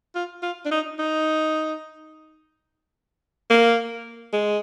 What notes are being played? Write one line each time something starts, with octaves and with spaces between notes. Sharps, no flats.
F4
F4
D4
D#4
D#4
A#3
G#3